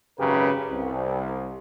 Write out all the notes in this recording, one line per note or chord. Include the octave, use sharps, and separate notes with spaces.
G#1 F#2 C#3 G4 A#4 B4
C2